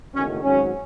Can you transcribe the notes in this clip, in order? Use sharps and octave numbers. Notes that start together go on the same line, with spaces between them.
F#1 E2 D#3 F#3 A3 C#4
G#1 G#2 F#3 C#4